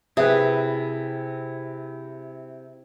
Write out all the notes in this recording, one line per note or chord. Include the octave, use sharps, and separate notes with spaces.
C3 E4 F#4 G#4 B4 E5 F#5